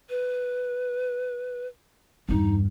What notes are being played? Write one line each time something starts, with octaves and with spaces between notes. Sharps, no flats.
B4
E2 G2 D#4